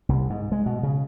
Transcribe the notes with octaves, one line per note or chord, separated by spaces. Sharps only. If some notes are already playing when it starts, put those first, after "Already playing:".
C2
G#2
G#3
B2
C#3